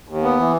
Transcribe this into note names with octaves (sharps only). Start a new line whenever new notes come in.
D#2
B3
E3